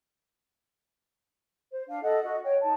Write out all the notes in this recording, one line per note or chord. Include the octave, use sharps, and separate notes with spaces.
C5
D4 F5
A4 D#5 F#5
F#4 D#5
C#5 G5
D#4 A5